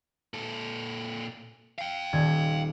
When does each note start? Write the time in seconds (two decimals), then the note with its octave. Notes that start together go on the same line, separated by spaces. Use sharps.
0.34 A#2 A4
1.78 F5 G5 C#7
2.13 D#1 G#6